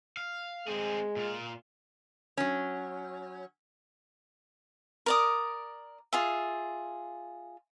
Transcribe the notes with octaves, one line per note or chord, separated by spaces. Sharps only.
F5
G#3 C4 G#4
A#2 F4
F#3 C#4
A#4 D5 D#6
F4 G#4 E5